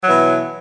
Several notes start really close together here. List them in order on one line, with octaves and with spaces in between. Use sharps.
F#3 E3 B2